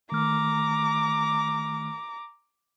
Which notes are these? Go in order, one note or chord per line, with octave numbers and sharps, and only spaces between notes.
D#3 A3 A#5 D6 F6